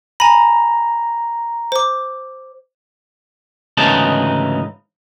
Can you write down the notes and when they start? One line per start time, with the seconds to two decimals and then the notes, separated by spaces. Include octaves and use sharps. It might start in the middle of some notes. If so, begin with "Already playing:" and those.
0.20 G#5 A#5 B5
1.72 C5 D6
3.77 D2 G#2 C#3 E3 D#4 A5